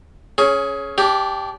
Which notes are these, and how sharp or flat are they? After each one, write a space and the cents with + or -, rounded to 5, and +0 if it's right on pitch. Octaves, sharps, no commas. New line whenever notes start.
C#4 +0 G#4 +20
D4 -25 G4 +0